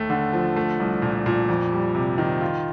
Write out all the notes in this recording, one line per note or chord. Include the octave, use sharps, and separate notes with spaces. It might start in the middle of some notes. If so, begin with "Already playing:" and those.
Already playing: D#2 A3
D3
F3
A3
C2
A#2
A#2
F2
G3
C3
D#3
F4